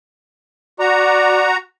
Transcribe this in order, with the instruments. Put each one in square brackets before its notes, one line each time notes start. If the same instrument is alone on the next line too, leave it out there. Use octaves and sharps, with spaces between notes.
[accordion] F#4 A#5 [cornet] D5